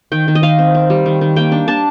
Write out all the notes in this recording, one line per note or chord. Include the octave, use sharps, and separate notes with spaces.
D#3 G5
D#3
D#5
D#3 F5
C4
C4
G3
D#3
D#3
A#3 G5
D4
D4 A5